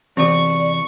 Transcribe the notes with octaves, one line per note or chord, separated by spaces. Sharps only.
E2 C3 E3 F#4 D5 C#6